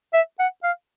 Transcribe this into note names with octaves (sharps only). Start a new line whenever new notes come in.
E5
F#5
F5